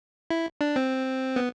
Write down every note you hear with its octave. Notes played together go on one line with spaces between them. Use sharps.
E4
D4
C4
B3